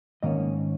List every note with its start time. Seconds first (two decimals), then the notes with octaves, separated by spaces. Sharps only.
0.23 G#2 D#3 A#3 C#4 D#5